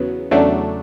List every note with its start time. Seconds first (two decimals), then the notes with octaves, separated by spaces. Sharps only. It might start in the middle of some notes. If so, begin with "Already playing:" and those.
Already playing: E2 C#3 F#3 B3
0.31 E2 C#3 F#3 A3 D4